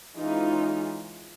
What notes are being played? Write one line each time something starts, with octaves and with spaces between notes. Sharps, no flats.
E3 G#3 C#4 D#4 F4